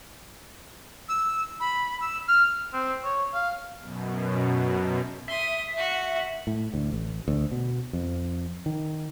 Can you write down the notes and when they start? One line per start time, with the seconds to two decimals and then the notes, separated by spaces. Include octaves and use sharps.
1.09 E6
1.60 B5
2.01 E6
2.28 F6
2.73 C4
3.04 C#5
3.34 F5
3.81 F#2 B2
5.28 E5 C6 D#6
5.77 F#4
6.47 A2
6.74 D2
6.92 A1
7.28 D2
7.52 B2
7.93 F2
8.66 D#3